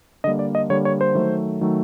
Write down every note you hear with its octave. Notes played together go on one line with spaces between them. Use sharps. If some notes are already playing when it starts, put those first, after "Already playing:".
D3 G3 A#3 D#5
D5
D#5
D3 G3 A#3 C#5
C#5
C5
D#3 F#3 A3
D#3 F#3 A3